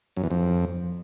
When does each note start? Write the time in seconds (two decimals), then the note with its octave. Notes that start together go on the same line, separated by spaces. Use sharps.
0.17 F#2
0.24 E2
0.31 F2